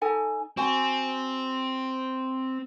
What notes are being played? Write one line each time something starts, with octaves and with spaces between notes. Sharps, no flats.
D#4 A4 G#5
C4 F#4 G#5